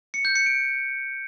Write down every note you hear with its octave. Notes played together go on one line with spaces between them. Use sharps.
C#7
G6
C#7
D7